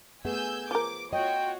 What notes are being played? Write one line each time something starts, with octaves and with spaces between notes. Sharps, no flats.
A3 B3 G#4 G#5 E6 G6
F3 A#4 D6
F4 F#4 C#5 D#5 G5